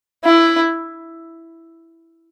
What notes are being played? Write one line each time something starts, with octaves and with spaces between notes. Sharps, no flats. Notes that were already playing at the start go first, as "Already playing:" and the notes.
E4